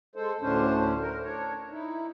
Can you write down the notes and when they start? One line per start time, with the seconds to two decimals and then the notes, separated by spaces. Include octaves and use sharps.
0.16 G#3 A4 C5
0.41 D2 A2 D3 C#4 D4 C5
1.02 A#4
1.23 D4 C#5
1.71 D#4 E4